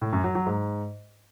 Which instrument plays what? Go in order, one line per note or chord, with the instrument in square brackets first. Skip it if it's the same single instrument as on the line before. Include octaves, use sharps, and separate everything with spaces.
[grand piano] A2
F#2
F#3
F#3
G#2